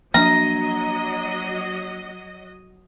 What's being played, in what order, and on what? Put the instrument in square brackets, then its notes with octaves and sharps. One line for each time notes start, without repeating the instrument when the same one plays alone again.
[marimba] F3 [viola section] F#3 D#5 [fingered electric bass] A#3 D4 [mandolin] A#5